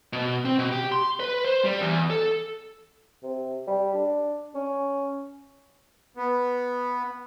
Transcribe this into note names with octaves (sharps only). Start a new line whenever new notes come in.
B2
C4
B2
G4
C6
B4
C5
G3
E2
A4
C3
G3
D4
C#4
B3